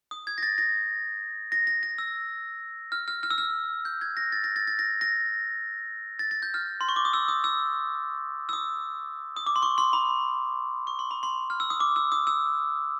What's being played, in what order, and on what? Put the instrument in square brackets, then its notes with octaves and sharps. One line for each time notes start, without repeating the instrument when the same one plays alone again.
[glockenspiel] D#6
G#6
A#6
A6
A#6
A#6
A#6
A#6
E6
F6
F6
F6
E6
F6
G6
G#6
A#6
A6
A#6
A6
A6
A#6
A#6
A6
A6
G6
F6
C6
C#6
D6
D#6
E6
D#6
E6
E6
D#6
D#6
D6
C6
C#6
C6
B5
C#6
C6
B5
C6
F6
E6
D#6
D6
E6
D#6
E6